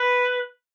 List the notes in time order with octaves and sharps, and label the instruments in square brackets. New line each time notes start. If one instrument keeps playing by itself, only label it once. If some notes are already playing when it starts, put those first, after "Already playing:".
Already playing: [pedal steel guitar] B4